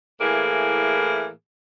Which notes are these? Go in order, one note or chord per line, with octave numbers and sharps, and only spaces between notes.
A2 E3 A#3 G#4